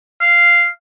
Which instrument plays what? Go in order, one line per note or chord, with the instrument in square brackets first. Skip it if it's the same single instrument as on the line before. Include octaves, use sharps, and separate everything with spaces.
[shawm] F5